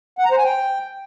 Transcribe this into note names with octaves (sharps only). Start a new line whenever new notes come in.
F#5
A#5
C5
G#5
G5